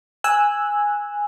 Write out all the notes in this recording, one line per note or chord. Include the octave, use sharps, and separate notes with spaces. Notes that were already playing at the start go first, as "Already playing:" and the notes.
G#5 E6 F#6